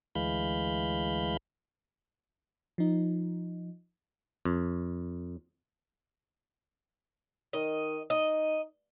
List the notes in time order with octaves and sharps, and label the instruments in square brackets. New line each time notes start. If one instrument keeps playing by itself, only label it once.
[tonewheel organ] D2 E3 G#3 F5 B5 G6
[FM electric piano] F3 D#4
[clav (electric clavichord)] F2
[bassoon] D#3 [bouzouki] D#5
[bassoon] D#4 [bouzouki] D#5